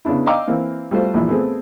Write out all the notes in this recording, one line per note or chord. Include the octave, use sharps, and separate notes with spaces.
C#3 B3 D4 E4
D#5 F5 G5 A#5 D6 E6
E3 A#3 C4
G3 A3 F4 F#4 C5
A#1 A#2 E3 E4
A3 B3 C4 G#4